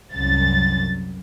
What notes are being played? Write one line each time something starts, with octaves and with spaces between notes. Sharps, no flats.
C2 F#2 A6